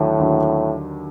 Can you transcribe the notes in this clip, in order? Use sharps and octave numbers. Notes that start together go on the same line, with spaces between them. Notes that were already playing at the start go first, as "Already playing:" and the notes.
Already playing: D#2 A2 D3 F#3
D#2 D3 F#3